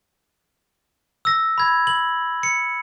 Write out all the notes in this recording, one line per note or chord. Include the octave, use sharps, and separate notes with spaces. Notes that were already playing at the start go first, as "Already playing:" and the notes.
E6 A#6
B5 G#6
F#7
C#7